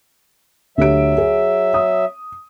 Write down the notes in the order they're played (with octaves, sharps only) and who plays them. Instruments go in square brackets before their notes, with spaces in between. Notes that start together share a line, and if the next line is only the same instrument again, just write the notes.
[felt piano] D2 G4 D7 [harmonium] F#3 E5
[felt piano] G#4
D#6